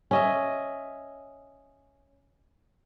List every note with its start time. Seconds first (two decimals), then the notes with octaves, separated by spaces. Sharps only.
0.11 C#4 D#5 E5